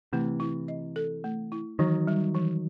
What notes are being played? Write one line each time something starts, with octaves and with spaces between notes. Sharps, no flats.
C3 E3 A3
E4
D#5
A4
A3
E4
D#3 E3 F#3
G3
E3